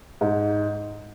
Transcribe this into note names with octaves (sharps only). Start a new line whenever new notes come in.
G#2